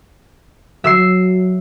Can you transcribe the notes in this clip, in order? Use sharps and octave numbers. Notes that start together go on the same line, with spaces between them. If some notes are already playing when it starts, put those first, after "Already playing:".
F#3 E5 E6 C7